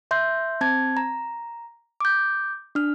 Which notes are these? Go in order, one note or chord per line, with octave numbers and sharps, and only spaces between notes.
E5 C6 G6
C4 A5 G#6
A#5
D6 G6
D4 F6